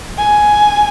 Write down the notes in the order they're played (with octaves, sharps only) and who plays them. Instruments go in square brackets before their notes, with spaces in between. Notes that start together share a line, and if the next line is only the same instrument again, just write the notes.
[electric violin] G#5